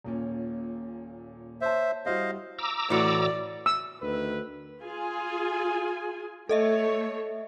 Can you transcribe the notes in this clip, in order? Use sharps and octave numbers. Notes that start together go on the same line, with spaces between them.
D#1 A#2 C#4
C5 C#5 E5 A5
G3 E4 F#4 C5 D#5 F5
A#5 D6 E6
A2 E3 F#4 D5
E6
D2 D#3 B4
F4 G#4 G#5
A3 A4 C#5 D#5 E5